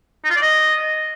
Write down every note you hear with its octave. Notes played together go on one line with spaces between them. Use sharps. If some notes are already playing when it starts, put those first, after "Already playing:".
D#4
F4
D5
D#5